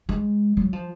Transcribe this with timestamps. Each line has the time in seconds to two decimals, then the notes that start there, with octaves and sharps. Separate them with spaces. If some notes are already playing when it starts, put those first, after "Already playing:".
0.09 G#3
0.57 F#3
0.73 F3